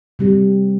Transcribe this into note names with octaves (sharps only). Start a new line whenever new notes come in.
C3 G3 C4 G4